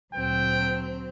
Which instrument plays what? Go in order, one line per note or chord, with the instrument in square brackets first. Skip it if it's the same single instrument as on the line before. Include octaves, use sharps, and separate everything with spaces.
[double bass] D2 A#2 [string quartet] F#3 C4 [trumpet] G5